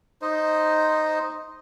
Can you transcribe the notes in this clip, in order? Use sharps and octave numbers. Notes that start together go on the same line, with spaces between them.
D#4 C5 D#5